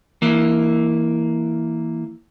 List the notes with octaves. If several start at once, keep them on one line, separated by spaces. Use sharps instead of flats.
E3 A#3